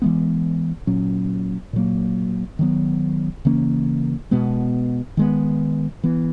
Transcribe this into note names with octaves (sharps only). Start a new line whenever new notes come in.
E3 G#3 B3
A#2 F#3 C#4
A#2 F#3 A#3
D#3 F#3 B3
C#3 E3 A#3 C#4
B2 G#3 B3
D#3 G#3 B3
E3 B3